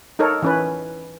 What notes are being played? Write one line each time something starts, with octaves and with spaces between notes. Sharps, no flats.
D#4 A4 A#4 C#5
E3 C#4 B4